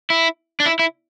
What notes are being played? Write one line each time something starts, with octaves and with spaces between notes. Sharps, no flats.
E4
D4
E4
E4